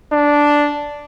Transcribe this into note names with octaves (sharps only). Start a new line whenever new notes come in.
D4